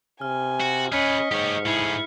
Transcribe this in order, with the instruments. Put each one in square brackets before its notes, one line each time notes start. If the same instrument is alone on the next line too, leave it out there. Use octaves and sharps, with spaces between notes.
[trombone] C3 [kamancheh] G#5 [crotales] F6
[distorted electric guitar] F#4
[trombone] C#4 [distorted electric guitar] G#4 B4 [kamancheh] D#5 [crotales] F6 B6 C#7
[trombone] G#2 [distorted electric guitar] G4 C#5
[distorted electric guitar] A2 G#4 [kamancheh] E4